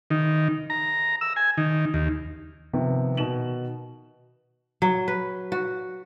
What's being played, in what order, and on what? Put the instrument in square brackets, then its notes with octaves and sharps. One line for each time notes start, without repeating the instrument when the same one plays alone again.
[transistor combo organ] D#3
A#5
E6
G#5
D#3
D#2
[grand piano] C3 D#3 F3 B3
B2 D#3 E7 F#7
[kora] F#3
B4
F#4